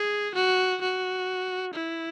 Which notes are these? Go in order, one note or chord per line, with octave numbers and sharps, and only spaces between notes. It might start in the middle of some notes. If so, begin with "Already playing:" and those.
Already playing: G#4
F#4
F#4
E4